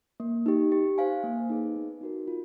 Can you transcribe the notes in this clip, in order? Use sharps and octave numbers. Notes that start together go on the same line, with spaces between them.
A#3
D#4 G4
G4
C5 F5 G#5
A#3
D#4 G#4 B4
B3
D#4 F#4 A#4
F4